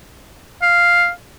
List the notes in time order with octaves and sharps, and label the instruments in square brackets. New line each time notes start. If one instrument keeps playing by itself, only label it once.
[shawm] F5